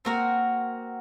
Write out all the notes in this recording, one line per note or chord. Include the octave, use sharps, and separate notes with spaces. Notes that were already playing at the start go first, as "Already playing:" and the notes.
A#3 C4 F#4 A#4